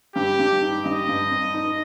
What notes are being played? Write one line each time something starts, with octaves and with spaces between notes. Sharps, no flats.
G2 G4
G2
D#4
G2 D#5
G2
C4
D#4